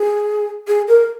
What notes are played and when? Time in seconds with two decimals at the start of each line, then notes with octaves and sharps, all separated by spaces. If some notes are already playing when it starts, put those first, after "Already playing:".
Already playing: G#4
0.68 G#4
0.88 A#4